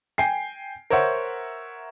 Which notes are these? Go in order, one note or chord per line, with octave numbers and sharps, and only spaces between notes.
G5 G#5 C7
A#4 C5 C#5 E5 F#5